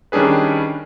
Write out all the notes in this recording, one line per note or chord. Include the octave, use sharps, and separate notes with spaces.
D#3 G3 C#4 D4 G#4 B4